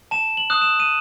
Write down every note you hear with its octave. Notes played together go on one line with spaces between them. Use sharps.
A5 E7
F#7
D#6 F#6
E7
D#7